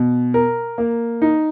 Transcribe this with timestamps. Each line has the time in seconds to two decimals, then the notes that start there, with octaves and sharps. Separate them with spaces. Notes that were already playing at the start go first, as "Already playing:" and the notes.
Already playing: B2
0.34 A#4
0.78 A#3
1.22 D#4